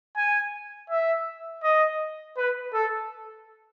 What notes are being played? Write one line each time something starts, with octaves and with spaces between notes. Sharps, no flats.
G#5
E5
D#5
B4
A4